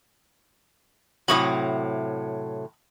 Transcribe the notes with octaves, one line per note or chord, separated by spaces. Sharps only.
A2 C3 F#3 B5 C#6 D#6